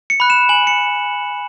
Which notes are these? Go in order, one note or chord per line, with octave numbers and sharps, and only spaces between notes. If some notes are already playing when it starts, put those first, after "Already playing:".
C#7
B5 F#6
E7
G#5 F#7
C#7